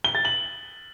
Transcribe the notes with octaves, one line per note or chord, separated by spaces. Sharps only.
G7
A6
F#7